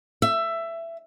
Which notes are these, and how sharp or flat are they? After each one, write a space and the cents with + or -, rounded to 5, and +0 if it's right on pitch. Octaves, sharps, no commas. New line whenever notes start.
E5 +15